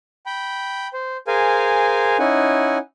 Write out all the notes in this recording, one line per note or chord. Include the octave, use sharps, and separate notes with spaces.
G5 B5
C5
G#4 A#4 C5 F5 G#5
C#4 D#4 E4 F#5 G#5